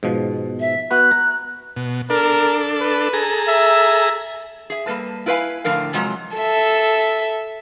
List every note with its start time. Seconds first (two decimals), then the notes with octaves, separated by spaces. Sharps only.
0.03 G#2 B2 F3
0.59 E5
0.91 B3 F#4 B4 F#6
1.11 A#5
1.76 B2
2.10 D4 A4 A#4
2.80 B4
3.13 G#4 A4 A#5
3.48 E5
4.70 G#4 E5
4.86 G3 A#3 A4 B4 A5
5.26 E4 F4 B4 C5 F5 G#5
5.64 A2 D3 F3 A#4 F5
5.93 C3 F3 F#3 G#3 F#5 A#5
6.37 A4 E5